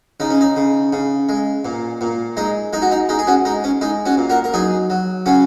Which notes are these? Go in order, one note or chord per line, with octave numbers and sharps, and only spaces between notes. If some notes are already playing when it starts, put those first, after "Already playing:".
C#3 D#4
C#4
D#4
C#3
C#3
G#3
A#2
A#2
G#3 D#4
G#3 D#4
F#4
D#4
G#3 D#4
G#4
C#4 F#4
G#3 D#4
C#4
G#3 D#4
C#4 F#4
A#2
F#4 A#4
A#4
F#3 D#4 G#4
F#3
C#3 C#4 F#4